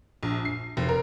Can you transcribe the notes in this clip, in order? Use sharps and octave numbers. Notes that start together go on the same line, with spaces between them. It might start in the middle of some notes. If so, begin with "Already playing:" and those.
A#1
C7
F1
A#4